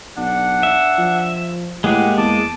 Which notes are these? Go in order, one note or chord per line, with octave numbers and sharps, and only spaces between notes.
B1 D4 F#5
E5
F3
A2 G#3 A#3 G4 G#4 F#5
E2 A5 D6